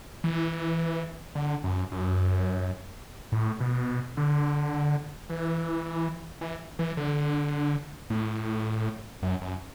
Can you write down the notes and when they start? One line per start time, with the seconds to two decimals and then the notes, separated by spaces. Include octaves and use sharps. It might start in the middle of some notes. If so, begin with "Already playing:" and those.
0.24 E3
1.35 D3
1.64 F#2
1.92 F#2
3.32 A2
3.60 B2
4.17 D3
5.30 E3
6.41 E3
6.79 E3
6.97 D3
8.10 A2
9.23 F#2
9.41 F#2